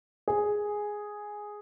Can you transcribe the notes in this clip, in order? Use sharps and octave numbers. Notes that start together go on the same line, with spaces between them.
G#4